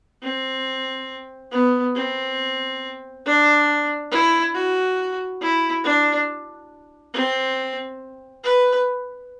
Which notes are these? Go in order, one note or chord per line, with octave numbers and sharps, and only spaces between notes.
C4
B3
C4
D4
E4
F#4
E4
D4
C4
B4